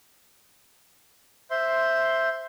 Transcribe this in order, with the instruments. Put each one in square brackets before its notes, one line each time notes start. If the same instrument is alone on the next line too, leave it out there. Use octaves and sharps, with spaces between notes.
[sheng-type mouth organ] C5 E5 C6